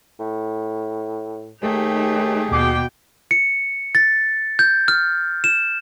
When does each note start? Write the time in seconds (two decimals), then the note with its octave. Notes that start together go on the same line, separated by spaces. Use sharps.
0.19 A2
1.62 D#2 A3 D#4 G4 G#4
2.51 D#2 B2 G5 D6 C7
3.31 C#7
3.95 A6
4.59 G6
4.88 F6
5.44 E7